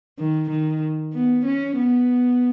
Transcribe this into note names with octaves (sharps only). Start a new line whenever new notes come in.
D#3
D#3
B3
C#4
B3